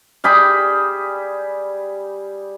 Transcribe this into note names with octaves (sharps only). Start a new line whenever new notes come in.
G3 G#4 G5 B5